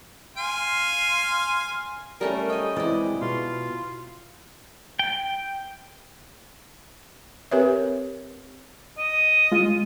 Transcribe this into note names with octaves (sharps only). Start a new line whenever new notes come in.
F5 G#5 C6
G3 A3 C#4 A#4
D#5 G5 G#5
E3 G#3 C4 E4 D5
B2 F4
G5
C4 G4 A#4 B4 C#5 E5
D#5
G#3 F4